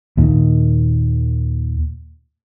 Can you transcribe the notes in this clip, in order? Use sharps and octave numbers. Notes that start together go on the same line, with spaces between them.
D#2 A#2 D#3